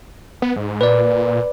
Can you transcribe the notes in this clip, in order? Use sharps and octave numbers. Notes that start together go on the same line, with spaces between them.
B3
G#2
A#2 B4 D5